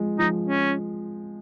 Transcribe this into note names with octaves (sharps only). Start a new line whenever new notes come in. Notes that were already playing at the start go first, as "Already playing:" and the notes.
Already playing: F3 G#3
F3 D#4
C#4